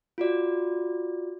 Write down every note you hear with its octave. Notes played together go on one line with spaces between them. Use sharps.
F4 F#4 D5